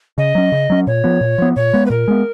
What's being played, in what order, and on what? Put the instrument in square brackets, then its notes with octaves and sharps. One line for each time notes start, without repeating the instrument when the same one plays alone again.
[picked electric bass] C#3 [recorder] D#5
[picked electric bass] F#3 C#4
C#3
F#3 C#4
[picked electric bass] A#2 [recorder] C#5
[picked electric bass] F3 B3
A#2
F3 B3
[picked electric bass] A#2 [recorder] C#5
[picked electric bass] G#3 B3
[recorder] B4
[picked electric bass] A#2 [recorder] A#4
[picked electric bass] G#3 B3